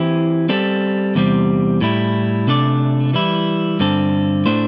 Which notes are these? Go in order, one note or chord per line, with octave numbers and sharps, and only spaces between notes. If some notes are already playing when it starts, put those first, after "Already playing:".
Already playing: E3 C4 E4 G4
G3 C4 A4
E2 C3 G3 C4
A2 G3 E4
C3 A3 D4 A4 D5
E3 G3 E4
G2 D3 C4 A4
A2 A3 D4 C5